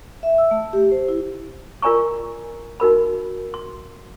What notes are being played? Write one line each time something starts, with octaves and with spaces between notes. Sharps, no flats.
E5
E6
A3
G4
C5
E4
F4 A#4 D5 G#5 A#5 C#6
D#4 F#4 A#4 B5
C6